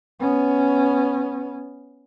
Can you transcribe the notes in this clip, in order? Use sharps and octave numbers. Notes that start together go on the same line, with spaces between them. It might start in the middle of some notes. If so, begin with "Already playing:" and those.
B3 C#4